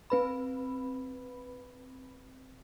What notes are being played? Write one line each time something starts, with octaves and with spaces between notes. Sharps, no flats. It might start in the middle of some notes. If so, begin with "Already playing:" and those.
C4 B4 B5